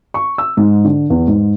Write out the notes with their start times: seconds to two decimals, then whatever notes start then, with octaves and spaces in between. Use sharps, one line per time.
0.14 C#6
0.38 E6
0.57 G#2
0.85 D3
1.10 E2
1.28 G#2